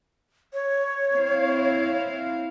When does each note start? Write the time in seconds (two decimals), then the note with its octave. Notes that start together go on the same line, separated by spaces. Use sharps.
0.53 C#5
1.12 C4 E4 F5